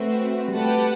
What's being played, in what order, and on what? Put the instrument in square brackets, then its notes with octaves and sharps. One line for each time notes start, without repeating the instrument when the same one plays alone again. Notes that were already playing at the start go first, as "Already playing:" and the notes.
Already playing: [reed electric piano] A3 [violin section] C4 F#4 B4 E5
[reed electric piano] G3
[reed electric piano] A3 [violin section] G4 B4 F#5 A5